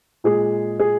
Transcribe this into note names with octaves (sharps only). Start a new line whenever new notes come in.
A#2 G#3 G#4
G#4